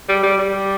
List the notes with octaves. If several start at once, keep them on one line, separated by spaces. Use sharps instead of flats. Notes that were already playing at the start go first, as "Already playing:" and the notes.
G3
G3
G3